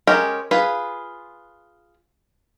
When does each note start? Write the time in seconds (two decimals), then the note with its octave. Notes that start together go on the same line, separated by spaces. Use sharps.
0.07 G#3 C#4 G4 A#4
0.51 F4 G#4 B4